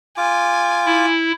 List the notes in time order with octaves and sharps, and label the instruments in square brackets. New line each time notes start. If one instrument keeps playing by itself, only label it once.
[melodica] F4 D6 [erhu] G#5
[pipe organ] E4